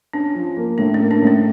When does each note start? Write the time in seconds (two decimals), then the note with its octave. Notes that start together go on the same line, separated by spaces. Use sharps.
0.13 C#4 D4
0.35 F3
0.57 A#3
0.78 A2 D4
0.94 C#4
1.00 A#3
1.11 D4
1.22 A2
1.27 C#4